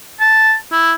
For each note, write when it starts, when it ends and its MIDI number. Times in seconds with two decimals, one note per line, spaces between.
0.20 0.55 81
0.72 0.93 64